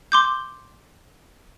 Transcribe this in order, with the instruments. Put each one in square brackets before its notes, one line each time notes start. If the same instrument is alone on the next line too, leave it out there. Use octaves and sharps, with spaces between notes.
[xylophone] C6 D6 G6